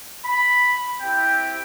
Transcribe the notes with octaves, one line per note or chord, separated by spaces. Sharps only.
B5
C4 E4 G4 G5